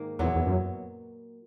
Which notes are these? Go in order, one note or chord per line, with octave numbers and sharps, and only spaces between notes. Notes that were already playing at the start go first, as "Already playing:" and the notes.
Already playing: G#2 D#3 A#3
E2 A#2 F#3 B3 E4
E2
F#2